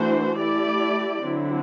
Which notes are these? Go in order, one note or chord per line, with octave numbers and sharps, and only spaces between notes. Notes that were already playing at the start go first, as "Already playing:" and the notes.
Already playing: E3 A3 D4 F#4 C5
A3 E4 G4 D5
D3 F#3 C4 E4